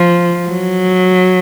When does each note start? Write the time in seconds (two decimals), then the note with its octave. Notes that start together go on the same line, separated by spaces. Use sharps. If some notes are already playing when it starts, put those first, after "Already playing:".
Already playing: F3
0.49 F#3